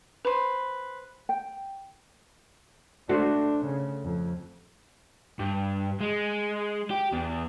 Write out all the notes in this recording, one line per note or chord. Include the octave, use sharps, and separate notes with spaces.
B4 C5
G5
A3 D4 F#4 C5
C#3
F2
G2
G#3
G4
E2